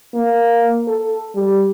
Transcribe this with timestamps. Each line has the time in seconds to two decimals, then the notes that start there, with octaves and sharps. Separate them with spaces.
0.15 A#3
0.88 A4
1.35 G3